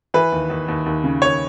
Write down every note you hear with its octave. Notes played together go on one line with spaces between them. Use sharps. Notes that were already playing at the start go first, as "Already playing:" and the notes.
E3 B4
D#2
D#2
D#2
D#2
C#3
D#2 C#5